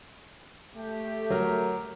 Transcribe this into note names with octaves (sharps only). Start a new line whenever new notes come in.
A3 G4
F#3 A#4